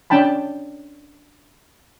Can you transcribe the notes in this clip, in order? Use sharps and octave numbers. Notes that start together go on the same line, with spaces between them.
C#4 D4 G5 A5 B5